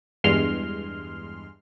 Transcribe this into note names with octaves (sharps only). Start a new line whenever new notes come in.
E2 G2 G#3 C6 F6